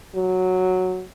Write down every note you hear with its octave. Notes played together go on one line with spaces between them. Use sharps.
F#3